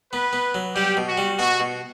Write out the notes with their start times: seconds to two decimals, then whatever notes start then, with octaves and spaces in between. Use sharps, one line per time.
0.12 B3 B4
0.33 B3
0.54 F#3
0.75 G3 G4
0.97 B2
1.07 F#4
1.17 G3
1.39 B2 F#4
1.60 B2